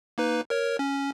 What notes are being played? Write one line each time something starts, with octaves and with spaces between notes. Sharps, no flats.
A#3 D#4 B4
A#4 C#5
C#4